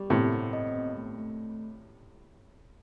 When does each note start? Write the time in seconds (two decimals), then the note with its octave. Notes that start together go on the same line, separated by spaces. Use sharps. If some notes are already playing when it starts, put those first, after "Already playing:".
Already playing: G3 G4
0.10 A2 C3 C4
0.32 C4
0.53 D#5
0.76 B3
0.97 A3
1.19 A3